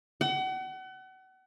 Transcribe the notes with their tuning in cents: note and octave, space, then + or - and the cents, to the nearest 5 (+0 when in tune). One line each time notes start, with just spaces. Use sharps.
F#5 +35